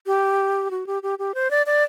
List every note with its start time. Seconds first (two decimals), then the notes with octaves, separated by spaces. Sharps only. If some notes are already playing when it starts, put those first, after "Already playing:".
0.06 G4
0.71 F#4
0.87 G4
1.03 G4
1.19 G4
1.34 C5
1.51 D5
1.66 D5